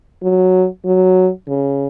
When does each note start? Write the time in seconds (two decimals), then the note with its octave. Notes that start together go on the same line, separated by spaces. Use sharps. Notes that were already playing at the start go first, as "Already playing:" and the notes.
0.23 F#3
0.85 F#3
1.48 C#3